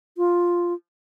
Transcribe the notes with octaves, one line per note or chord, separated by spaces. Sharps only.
F4